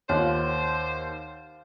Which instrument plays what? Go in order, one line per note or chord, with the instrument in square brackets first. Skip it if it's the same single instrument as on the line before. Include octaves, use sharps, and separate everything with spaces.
[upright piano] D#2 D#3 [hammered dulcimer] F4 F#5 [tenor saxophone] C5 [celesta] C#5